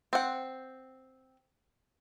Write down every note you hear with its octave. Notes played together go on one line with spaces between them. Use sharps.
C4 F#5